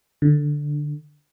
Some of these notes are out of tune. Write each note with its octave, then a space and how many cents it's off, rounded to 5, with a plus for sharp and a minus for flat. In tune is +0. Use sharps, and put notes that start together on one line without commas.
D3 +5